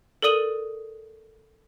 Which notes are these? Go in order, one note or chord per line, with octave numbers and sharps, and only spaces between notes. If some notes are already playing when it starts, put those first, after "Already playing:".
A4 A#4 D5 D#6 D#7 F#7